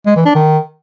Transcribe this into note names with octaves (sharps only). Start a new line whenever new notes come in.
G#3
E3
D4
D#3